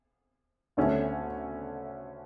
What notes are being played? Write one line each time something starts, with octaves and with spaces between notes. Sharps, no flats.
D2 D3 A3 C#4